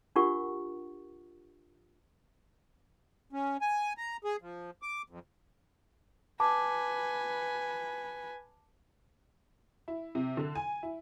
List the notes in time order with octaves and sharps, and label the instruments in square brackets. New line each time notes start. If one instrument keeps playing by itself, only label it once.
[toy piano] D4 F4 G4 A#4 F#5 C#6
[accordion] C#4
G#5
A#5
G#4
F3
D6
F2
[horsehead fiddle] B4 G#5 [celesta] A5 D6
[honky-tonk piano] E4
C3
D3
G#5
E4